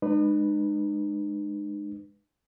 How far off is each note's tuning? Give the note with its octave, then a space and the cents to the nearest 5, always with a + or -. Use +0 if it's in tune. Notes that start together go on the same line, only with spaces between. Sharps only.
G#3 +0 D#4 -45 B4 +0